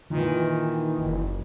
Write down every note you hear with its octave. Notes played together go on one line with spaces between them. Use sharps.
A#2 D#3 E3
F#1